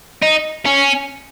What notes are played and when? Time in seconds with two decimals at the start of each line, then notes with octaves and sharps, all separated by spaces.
0.23 D#4
0.66 C#4